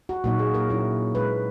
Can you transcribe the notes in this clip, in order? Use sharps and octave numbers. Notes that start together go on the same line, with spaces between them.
F#4
A#2 F#3 A#3 D#4 F#4
G#4
A#4
F#3 A#3 C#4 E4
A#2 G#3 C#4 B4